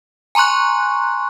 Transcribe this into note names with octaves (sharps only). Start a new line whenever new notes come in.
G#5 A#5 C6 C#6 F#6